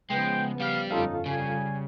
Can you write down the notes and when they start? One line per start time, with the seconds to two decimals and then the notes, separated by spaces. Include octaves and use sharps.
0.10 C#3 F3 G#3 B3 G5
0.60 G3 G4 F5
0.91 G1 F2 C#4 D#4 F4 A4 F5
1.26 C#3 G3 G#5